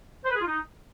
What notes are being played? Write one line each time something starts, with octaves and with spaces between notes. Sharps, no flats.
C5
B4
G#4
F4
D#4